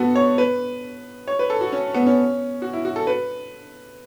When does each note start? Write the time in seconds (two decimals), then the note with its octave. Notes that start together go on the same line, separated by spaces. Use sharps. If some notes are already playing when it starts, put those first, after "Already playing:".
Already playing: B3 F#4 A4
0.15 C#5
0.38 B4
1.28 C#5
1.39 B4
1.50 A4
1.61 F#4
1.72 C#4
1.94 B3
2.06 C#4
2.62 F#4
2.73 E4
2.85 F#4
2.96 A4
3.07 B4